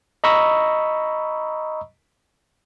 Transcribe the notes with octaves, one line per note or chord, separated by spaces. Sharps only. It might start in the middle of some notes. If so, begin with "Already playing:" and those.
D#5 A#5 B5 C#6 D#6 E6